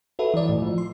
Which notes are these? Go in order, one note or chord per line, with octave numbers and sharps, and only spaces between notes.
F#4 A4 B4 E5
E3 D5
A2
F3
C6